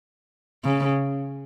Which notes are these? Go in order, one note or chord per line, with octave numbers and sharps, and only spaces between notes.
C#3